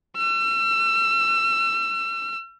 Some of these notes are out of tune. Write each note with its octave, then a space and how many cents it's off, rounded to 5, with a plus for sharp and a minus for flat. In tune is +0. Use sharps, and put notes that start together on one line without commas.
E6 +40